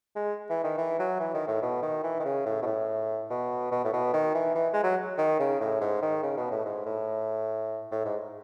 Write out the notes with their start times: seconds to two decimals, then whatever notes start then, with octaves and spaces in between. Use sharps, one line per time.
0.15 G#3
0.50 E3
0.64 D#3
0.78 E3
0.99 F#3
1.19 E3
1.34 D#3
1.47 A2
1.62 B2
1.82 D#3
2.04 E3
2.19 D#3
2.25 C#3
2.46 A2
2.62 B2
2.66 A2
3.30 B2
3.71 B2
3.85 A2
3.93 B2
4.13 D#3
4.34 E3
4.55 E3
4.73 G#3
4.83 F#3
5.18 D#3
5.39 C#3
5.60 A2
5.81 G#2
6.03 D#3
6.23 C#3
6.37 B2
6.51 A2
6.65 G#2
6.86 A2
7.91 A2
8.05 G#2